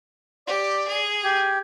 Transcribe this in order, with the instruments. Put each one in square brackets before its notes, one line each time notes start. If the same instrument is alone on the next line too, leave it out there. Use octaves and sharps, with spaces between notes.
[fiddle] G4 [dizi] D5
[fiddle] G#4
[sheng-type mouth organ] G4 [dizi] G#6